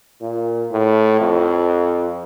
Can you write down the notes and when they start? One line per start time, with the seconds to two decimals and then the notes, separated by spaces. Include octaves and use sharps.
0.21 A#2
0.71 A2
1.20 F2